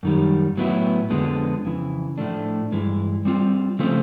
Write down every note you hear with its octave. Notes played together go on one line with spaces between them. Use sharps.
F#2 D#3 G3
A2 F#3 B3 E4
F2 D3 F3 G#3 B3
F2 C#3 E3
A2 F3 A3 D4
G2 E3 G#3
G3 C4 F4
C#3 F3 A3 C4